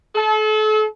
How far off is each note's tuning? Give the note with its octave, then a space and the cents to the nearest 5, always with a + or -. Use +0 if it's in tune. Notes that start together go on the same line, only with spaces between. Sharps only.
A4 -35